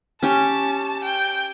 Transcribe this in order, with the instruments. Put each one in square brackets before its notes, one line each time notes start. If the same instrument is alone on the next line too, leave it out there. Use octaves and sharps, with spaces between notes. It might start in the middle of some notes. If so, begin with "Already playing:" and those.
[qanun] C#4 G4 [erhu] A5
[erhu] G5